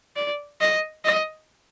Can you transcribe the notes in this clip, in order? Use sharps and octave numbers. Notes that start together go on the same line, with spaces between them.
D5
D#5
D#5